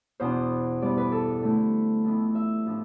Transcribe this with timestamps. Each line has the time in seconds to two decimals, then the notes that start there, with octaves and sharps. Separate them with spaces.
0.20 E2 B2 B3 D4 C5
0.82 G2 E3 B3 D5
0.98 B4
1.12 A4
1.43 D3 A3 E4
2.04 F2 E3 B3 E4
2.35 E5
2.66 A2 F3 B3 D4